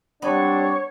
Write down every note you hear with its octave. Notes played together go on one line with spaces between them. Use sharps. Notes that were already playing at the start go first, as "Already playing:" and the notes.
G3 B3 C4 D4 C#5